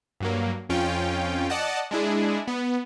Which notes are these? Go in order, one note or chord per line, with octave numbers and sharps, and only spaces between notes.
G2 F#3 A#3
F2 C#4 F4 G5
D5 D#5 F#5 A5
G#3 D4 E4 G#4
B3